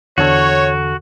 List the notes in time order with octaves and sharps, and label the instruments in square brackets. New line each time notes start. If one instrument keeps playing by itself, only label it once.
[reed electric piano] E2 D3 A4 [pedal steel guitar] F#4 [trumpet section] C#5